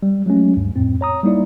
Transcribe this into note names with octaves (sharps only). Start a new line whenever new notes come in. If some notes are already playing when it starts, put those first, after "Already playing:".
G3
F#3 G#3 A3 C#4
D2 G2
F2 A2 C4
C#5 A#5 D#6
G3 A#3 D#4 E4 D5